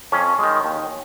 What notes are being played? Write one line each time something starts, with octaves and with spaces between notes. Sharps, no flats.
F2 C#4
D#3 G#3
D#2